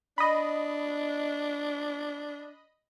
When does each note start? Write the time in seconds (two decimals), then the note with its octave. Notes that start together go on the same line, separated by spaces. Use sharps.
0.18 D4 D#5 B5